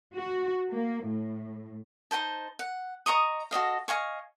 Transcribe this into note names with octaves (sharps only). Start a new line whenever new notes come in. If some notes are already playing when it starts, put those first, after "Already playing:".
F#4
A#3
A2
D#4 G4 C5 A5
F#5
D#5 A#5 C#6 D#6
F#4 A4 D#5 F5
D#5 F5 G#5 C#6